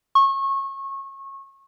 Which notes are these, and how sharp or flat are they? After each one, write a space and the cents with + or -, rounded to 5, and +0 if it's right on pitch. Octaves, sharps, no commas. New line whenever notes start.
C#6 -25